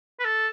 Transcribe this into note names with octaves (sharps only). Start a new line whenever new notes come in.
B4
A4